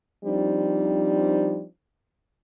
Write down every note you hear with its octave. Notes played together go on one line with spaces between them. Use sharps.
F3 G3 C4 D4 D#4